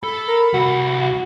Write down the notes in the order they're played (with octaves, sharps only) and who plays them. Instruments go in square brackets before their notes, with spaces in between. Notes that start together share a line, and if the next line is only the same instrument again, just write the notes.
[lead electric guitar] A4 [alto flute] B5
[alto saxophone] A#4
[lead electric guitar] C2 F#5 [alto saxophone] F#4